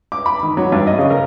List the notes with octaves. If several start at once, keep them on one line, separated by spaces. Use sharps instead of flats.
D6
B5
D#3
F#3
G2
D#5
C#3
A#4